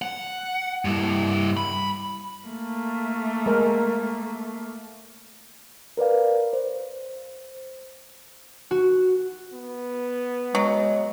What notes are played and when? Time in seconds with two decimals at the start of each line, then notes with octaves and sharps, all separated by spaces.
0.02 F#5
0.85 G2 E4
1.57 B5
2.46 A3 A#3
3.46 G#3 A#4
5.97 A#4 B4 D5 F5
6.53 C5
8.71 F#4
9.53 B3
10.55 F#3 G#3